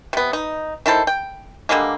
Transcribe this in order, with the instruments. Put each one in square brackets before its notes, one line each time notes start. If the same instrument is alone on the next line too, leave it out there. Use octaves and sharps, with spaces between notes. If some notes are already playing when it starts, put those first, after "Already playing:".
[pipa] C3 B3
D#4
D#3 E4 A4 C5
G5
D3 G3 G#3 A#3